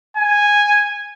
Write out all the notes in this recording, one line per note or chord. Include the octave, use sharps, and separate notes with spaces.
G#5